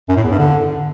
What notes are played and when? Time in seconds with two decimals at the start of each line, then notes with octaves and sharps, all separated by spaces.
0.08 F#2
0.16 A2
0.24 E2
0.31 G2
0.39 D3